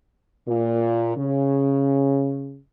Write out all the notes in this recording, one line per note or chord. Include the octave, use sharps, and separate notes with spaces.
A#2
C#3